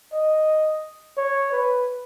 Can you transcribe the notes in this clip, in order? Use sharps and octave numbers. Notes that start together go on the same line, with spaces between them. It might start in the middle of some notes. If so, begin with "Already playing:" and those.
D#5
C#5
B4